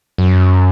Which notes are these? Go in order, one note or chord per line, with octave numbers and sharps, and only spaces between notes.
F#2